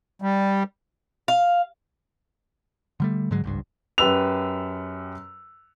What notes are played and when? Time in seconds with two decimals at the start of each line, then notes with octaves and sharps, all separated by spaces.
0.22 G3
1.28 F5
3.00 D3 G3 A3
3.31 G#2 D3 F#3 G#3
3.44 G#1 C#2 G2
3.98 F#2 G4 B4 E6 F7